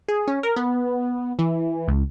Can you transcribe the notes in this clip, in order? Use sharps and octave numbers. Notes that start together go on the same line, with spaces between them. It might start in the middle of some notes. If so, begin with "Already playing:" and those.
G#4
C#4
A#4
B3
E3
C#2